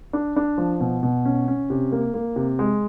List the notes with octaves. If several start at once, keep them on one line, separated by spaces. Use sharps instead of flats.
D4
D4
F3
B2
B2
C#4
C#4
C3
A#3
A#3
C3
G#3